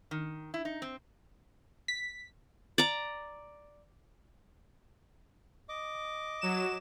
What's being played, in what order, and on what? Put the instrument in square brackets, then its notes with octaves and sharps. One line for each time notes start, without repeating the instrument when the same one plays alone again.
[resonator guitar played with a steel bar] D#3
E4
D#4
C4
[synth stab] B6
[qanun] D5 A#5
[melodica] D#5 D6
[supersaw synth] F#3 E7